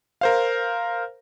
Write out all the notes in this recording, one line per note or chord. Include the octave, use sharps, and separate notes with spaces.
A#4 C5 F5